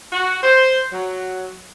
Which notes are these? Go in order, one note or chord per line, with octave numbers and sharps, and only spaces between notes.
F#4
C5
F#3